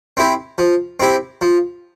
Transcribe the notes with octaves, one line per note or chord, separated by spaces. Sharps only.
C4 E4 G4
F3
C4 E4 G4
F3